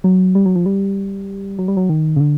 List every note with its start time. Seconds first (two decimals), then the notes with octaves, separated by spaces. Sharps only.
0.04 F#3
0.35 G3
0.46 F#3
0.56 F3
0.66 G3
1.59 F#3
1.68 G3
1.77 F#3
1.89 D#3
2.16 C#3
2.20 D3